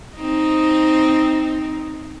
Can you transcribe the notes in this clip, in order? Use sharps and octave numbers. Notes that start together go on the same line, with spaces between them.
C4 D#4